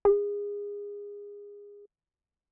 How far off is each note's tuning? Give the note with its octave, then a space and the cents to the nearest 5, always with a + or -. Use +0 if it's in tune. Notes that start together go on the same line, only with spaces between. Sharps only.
G#4 -25